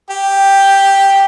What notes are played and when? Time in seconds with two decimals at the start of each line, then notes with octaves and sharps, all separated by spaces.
0.10 G4